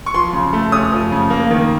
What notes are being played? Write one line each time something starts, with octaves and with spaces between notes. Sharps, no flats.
C#6
F3 C6
C#3
A3
C#4 D#6
F3
C#3
A#3
D#3